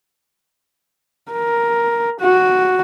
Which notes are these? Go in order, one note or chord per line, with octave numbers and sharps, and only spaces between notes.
A#4
F#4